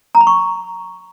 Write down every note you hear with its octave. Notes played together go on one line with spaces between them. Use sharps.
A#5
B5
C#6